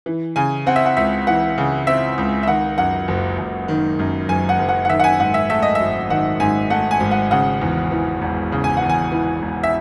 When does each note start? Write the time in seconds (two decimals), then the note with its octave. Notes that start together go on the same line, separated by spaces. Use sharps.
0.06 E3
0.36 C#3 G#5
0.66 C4 F#5
0.76 E5
0.86 F#5
0.97 C#2 E5
1.27 E3 F#5
1.58 C#3
1.87 C4 E5
2.18 C#2
2.43 E5
2.47 D#3 F#5
2.78 F#2 F#5
3.08 F#1
3.39 F#1
3.68 D#3
3.99 F#2
4.29 F#1 G#5
4.49 F#5
4.59 F#1
4.69 F#5
4.85 F#5
4.89 D#3 E5
5.00 F#5
5.04 G#5
5.20 G#2 F#5
5.34 E5
5.50 A3 E5
5.62 D#5
5.75 E5
5.80 G#1
6.10 D#3 F#5
6.40 G#2 G#5
6.70 A3 F#5
6.91 G#5
7.00 G#1
7.11 F#5
7.31 C#3 F#5
7.61 E2
7.91 E3
8.21 E1
8.52 C#3
8.64 G#5
8.77 F#5
8.82 E2
8.90 G#5
9.12 E3
9.42 E1
9.63 E5